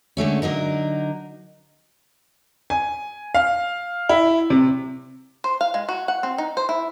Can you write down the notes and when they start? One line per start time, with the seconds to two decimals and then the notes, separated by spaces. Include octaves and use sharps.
0.17 D3 G#3 A3 C#4
0.42 D3 F#3 D#4 A#4
2.70 G#5
3.34 F5
4.09 E4
4.50 C3
5.44 C5
5.61 F5
5.74 G#3
5.89 F#4
6.08 F#5
6.23 C4
6.38 D#4
6.57 C5
6.69 E4